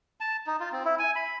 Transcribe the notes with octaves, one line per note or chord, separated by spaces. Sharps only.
A5
D#4
F4
C4
E4
G#5
B5